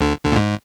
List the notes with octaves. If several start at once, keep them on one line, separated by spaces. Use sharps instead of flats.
D2 D3
D2 D3
A#2
G#2